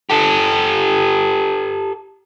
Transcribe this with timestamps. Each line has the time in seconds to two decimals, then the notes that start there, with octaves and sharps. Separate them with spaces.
0.10 G4 A4